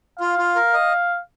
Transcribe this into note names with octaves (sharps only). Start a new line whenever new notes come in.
F4 F5
F4
A#4
D#5